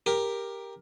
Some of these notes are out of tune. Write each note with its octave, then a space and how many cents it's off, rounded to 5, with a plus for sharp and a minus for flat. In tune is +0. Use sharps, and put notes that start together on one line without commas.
G4 +15 A#4 +5